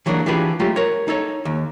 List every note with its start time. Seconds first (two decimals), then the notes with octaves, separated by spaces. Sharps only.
0.06 E3 F#3 G#3 A#3 D4
0.26 E3 D4 F4 G4 G#4 B4
0.60 F#3 G#3 A3 F4 G4
0.76 A#4 C#5
1.08 D#4 A4 C#5
1.45 D#2